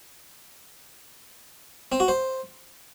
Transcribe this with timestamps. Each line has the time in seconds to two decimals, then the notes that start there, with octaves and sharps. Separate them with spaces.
1.92 C4
2.00 F#4
2.08 C5